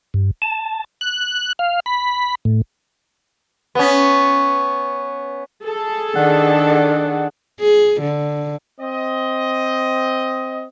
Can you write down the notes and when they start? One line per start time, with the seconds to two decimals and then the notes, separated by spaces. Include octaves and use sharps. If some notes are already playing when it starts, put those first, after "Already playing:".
0.14 G2
0.42 A5
1.01 F#6
1.59 F5
1.86 B5
2.45 A2
3.75 B3 C#4
5.63 G#4 A4
6.15 D#3 D4 D5 F#5
7.60 G#4
8.01 D3
8.80 C4 D#5